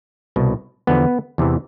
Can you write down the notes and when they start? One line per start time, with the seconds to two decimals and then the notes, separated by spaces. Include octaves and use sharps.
0.36 C2 B2
0.87 E2 D3 F3 B3
1.38 E2 C3 E3